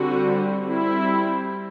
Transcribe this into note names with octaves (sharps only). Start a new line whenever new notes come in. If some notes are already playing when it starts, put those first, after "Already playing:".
Already playing: D3 G3 C4 F#4
G3 C4 E4